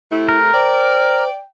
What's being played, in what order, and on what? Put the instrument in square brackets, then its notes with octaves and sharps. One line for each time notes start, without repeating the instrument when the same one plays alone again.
[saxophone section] C3 A3 [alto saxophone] E4
[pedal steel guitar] A#4
[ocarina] C5 [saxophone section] D5 [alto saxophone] G5